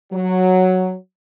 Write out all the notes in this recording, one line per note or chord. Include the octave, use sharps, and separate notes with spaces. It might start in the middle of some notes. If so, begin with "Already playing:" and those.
F#3